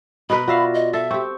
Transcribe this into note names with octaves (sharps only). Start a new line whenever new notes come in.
B2 A#4 B4 B5
F4 F#4 D5 E5 F5 A#6
D#5
A4 E5
C4 G4 C#6